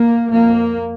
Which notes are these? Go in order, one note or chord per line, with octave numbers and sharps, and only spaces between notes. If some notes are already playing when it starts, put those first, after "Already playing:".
Already playing: A#3
F2 A#3